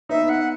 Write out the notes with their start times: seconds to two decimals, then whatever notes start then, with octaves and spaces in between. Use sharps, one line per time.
0.09 B3 D#4 E5
0.29 F#5